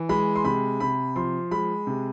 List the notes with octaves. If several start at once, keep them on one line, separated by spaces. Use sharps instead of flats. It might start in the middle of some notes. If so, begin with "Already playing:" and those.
Already playing: E3
G#3 B5
C6
C3 B5
C3 B5
F3 C6
G#3 B5
C3